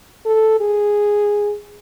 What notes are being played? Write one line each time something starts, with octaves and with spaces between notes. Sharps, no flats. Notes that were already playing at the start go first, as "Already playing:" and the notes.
A4
G#4